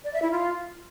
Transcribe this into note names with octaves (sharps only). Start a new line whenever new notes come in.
D5
E5
E4
F4